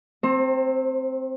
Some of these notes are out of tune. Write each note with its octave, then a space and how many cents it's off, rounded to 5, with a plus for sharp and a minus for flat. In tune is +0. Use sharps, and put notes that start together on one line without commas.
C4 +0 C5 +35 A#5 -45